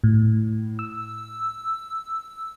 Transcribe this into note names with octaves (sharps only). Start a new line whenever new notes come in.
A2
E6